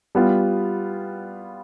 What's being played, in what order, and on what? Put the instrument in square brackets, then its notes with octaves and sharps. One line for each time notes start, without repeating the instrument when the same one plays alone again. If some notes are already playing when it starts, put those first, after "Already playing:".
[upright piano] G3 B3 F4